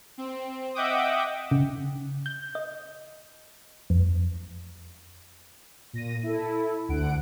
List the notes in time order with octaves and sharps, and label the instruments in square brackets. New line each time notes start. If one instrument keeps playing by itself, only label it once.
[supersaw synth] C4
D#5 E5 F#5 G5 D6 D#6
[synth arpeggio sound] C#3
G6
D#5
F2
[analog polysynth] A#2 A#6 D#7
E4 A4
D2 D3 F#5 D7